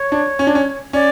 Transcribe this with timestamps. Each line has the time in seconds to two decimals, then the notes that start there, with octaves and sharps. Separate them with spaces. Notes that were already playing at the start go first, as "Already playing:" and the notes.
Already playing: C#5
0.12 D4
0.39 C#4
0.47 D4
0.55 C#4
0.93 C#4 D5